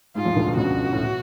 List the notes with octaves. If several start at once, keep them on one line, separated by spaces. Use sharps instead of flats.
G#2 G#3 F4
F2 F3
D2 D3
B2
C#2 C#3 F#4
A2
B2